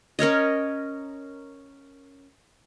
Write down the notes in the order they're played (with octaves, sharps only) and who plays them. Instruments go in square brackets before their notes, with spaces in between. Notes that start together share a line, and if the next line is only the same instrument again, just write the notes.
[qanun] C#4 A#4 C#5 D#5